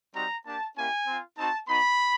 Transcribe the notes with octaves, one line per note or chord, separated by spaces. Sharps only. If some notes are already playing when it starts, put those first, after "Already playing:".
G3 C4 D#4 F#4 A#5
A#3 D4 G4 A5
A#3 C#4 E4 G4 G#5
C4 F4
C4 D#4 F#4 A5
B3 D#4 F#4 B5